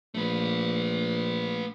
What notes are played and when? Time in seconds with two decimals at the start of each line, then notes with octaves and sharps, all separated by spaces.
0.14 A#1 A3 B4